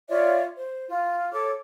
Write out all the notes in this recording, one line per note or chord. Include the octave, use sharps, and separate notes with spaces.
F4 C#5 D5 E5
C5
F4
A4 C#5 D6